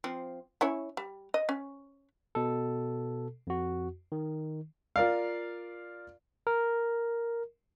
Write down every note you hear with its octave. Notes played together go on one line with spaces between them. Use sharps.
F3 C4
C#4 E4 C#5
G3
D#5
C#4
B2 A4
F2 F#4
D#3
F4 A#4 D5 F5
A#4